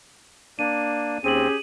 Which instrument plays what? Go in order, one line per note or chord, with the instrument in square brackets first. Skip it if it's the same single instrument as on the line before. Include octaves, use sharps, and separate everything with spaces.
[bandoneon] A#3 D4 [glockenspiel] D#7
[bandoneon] D#2 C4 [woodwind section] C#4 G4 G#4 [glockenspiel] D#7 F#7